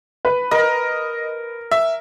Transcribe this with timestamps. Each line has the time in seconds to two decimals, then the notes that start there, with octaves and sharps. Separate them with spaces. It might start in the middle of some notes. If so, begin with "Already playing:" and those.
0.25 B4
0.51 A#4 D#5
1.71 E5